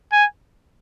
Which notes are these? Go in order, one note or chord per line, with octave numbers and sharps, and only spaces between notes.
G#5